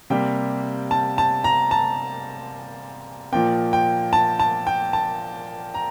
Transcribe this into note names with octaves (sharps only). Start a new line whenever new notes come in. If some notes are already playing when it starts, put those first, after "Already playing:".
C3 G3 A#3 G5
A5
A5
A#5
A5
A#2 F3 A#3 G5
G5
A5
A5
G5
A5
A#5